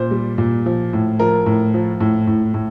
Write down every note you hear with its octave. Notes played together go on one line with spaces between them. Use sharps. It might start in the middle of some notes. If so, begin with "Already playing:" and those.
Already playing: A#2 C5
G3
A#2
F3
A2
F3 A#4
A2
F3
A2
A2
A2